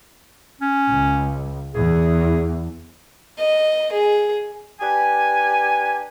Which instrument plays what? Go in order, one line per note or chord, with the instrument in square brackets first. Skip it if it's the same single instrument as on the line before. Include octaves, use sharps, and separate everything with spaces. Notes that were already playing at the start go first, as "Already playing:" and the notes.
[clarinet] C#4
[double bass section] C#2
[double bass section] E2 [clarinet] G#4
[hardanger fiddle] D#5
G#4
[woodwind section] D4 G4 B4 G#5